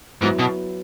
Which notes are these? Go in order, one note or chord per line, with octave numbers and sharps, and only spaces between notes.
G#2 F#3 B3 E4
B2